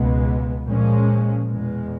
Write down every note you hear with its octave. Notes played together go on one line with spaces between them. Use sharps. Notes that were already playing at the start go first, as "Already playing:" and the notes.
Already playing: C#2 B2 G#3 B3
A#2 F3 G#3 C#4
E2 B2 G#3